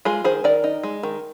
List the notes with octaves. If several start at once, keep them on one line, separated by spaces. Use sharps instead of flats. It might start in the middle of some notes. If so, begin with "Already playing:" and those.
G#3 F4 G#4
D#3 G#4 C5
D#3 A#4 D5
D#4
G#3
D#3